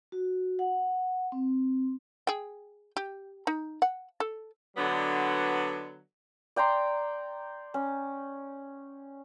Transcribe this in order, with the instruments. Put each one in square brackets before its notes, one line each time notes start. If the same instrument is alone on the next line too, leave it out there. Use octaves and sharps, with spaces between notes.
[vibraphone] F#4
F#5
C4
[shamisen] G#4 G5
G4
D#4
F#5
A4
[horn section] D3 F#3 B3
[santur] D5 G5 A#5 C6
C#4